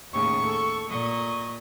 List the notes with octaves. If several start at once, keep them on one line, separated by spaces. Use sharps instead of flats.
D#2 A2 C#3 C#6
A4
A#2 D#5 C#6